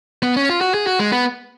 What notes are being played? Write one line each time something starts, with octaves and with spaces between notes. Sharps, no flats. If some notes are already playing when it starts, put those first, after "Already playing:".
B3
C#4
F4
F#4
G#4
F#4
G#3
B3